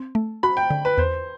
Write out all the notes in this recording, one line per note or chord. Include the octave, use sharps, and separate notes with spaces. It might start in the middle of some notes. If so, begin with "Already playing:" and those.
Already playing: C4
A3
F#4 B5
G5
D3
B4
E2 C5